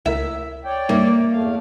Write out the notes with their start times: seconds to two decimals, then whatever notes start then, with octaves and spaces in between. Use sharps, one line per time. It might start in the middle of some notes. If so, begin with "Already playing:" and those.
0.06 C#2 A3 E4 A#4 E5
0.65 C#5 D5 G5
0.89 G2 A#3 D#4 E5 C#7
1.31 E2 A3 F5